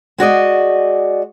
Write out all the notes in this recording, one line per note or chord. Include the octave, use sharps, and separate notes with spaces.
G#3 F#4 D5 D#5